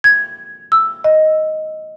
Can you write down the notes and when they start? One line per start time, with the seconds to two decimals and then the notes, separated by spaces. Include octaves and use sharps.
0.04 G#6
0.72 E6
1.04 D#5